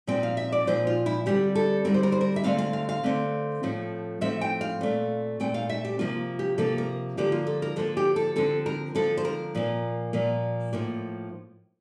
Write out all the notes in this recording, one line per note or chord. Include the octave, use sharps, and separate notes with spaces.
A#2 F3 C4 G5
F5
E5
D5
A#2 F3 C4 C5
F4
E4
D3 G3 C4 G4
A4
D3 G3 C4 A#4
C5
A#4
C5
A#4
E5
D3 A3 C4 F5
F5
F5
F5
D3 A3 C4
A2 F3 A3 C4
A2 F3 A3 C4 E5
G5
F5
A#2 A3 C4
A#2 A3 C4 G5
F5
E5
G4
C3 F3 A#3 F4
G4
C3 F3 A#3 A4
A#4
D3 F3 A#3 G4
F4
A4
A#4
D3 F3 A#3 A4
G4
A4
D3 F3 C4 A4
A#4
D3 F3 C4 A4
C5
A#4
A#2 F3 A#3
A#2 F3 A#3
A2 F3 A#3